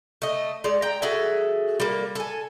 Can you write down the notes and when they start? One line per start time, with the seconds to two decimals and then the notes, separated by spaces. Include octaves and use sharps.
0.22 A3 D#5
0.64 G#3 D5
0.82 G5 A#5
1.02 F#4 G#4 A4 E5
1.80 G3 A#3
2.15 A4 G#5